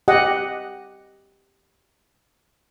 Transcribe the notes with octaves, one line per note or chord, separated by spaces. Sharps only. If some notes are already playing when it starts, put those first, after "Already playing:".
G4 D#5 F#5